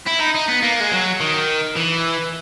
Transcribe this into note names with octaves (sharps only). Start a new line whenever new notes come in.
E4
D#4
D#4
B3
A#3
G#3
F#3
D#3
E3